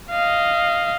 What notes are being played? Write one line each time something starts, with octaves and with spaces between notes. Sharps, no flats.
D#5 F5